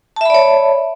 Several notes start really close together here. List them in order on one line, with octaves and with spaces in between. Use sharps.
A5 E5 B5 D5 C#5